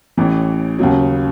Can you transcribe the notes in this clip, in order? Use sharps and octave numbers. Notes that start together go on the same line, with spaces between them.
A1 A2 E3
D#2 C#3 F#3